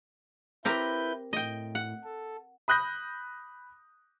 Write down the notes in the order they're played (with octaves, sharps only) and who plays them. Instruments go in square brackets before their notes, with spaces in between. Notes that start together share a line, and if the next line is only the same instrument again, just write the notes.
[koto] C4 G4 A#4 [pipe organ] E4 B4 G6
[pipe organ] A2 [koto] D#5 G5
[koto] F#5
[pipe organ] A4
[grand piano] B5 D#6 F#6 G6 A#6